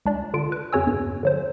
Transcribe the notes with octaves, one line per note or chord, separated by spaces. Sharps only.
C#2 D4 D5
D3 F4 D7
B4
F2 C#3 F#4 C#5 G#5 E6
E2 G2
D3 F#3 C5